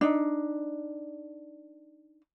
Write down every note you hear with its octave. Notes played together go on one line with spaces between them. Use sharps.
D4 D#4